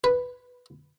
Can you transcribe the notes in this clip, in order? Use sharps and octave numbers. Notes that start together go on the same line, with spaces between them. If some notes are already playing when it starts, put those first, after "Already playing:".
B4